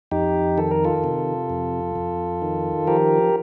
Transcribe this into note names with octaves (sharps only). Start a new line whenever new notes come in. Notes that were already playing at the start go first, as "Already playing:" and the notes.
F2 D#4 G4
D#3 A4
A#4
F4 A4
C3
F2
F2
D#3
F3 G4 A#4